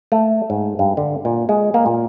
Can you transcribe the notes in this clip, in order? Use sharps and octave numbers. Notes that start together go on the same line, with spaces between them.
A3
G#2
G2
D3
A#2
G#3
A#3
A#2